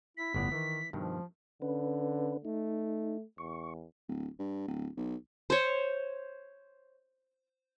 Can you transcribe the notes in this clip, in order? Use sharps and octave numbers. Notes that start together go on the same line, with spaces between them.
E4 B6
G1 A2 B3 D5
D#3 E3
G2 B2 D#3 F3
D3 C#4 B4
A3 D#4
E2 C#6
D1
G2
D1
B1
C5 C#5